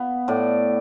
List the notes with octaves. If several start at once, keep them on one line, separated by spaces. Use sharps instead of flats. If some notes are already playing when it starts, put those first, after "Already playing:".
Already playing: B3 F5
A2 D5